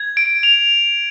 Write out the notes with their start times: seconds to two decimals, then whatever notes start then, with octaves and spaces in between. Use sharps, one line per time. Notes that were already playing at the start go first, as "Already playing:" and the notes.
Already playing: G#6
0.17 D7
0.43 F7